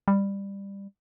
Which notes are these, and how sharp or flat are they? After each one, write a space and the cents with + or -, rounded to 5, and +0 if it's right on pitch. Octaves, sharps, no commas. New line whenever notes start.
G3 +15